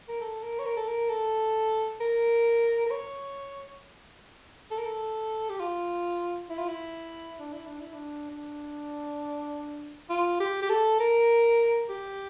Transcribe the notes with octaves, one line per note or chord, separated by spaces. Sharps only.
A#4
A4
A#4
C#5
A#4
A4
A#4
A4
A#4
A#4
C#5
A4
A#4
A4
G4
F4
E4
F4
E4
D4
E4
D4
E4
D4
D4
F4
G4
G4
A4
A#4
G4